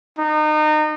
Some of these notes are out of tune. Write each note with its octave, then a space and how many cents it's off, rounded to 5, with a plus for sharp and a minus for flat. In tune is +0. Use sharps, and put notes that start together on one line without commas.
D#4 -30